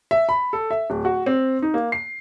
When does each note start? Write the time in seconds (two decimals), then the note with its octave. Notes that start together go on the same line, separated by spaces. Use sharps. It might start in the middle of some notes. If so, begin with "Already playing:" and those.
0.11 E5
0.29 B5
0.53 A4
0.71 E5
0.90 D1
1.05 F#4
1.26 C4
1.62 D#4
1.74 A#3
1.92 C7